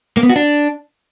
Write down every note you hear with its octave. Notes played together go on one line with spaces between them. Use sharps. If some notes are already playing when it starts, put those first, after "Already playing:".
A#3
B3
F#4
D4